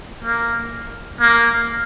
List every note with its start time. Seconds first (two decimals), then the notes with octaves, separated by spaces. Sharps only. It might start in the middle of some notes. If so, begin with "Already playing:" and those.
0.23 A#3
1.20 A#3